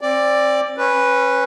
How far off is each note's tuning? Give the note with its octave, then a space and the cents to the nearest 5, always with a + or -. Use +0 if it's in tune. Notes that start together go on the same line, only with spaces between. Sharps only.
C4 +35 D5 +0
C#4 -20 B4 +0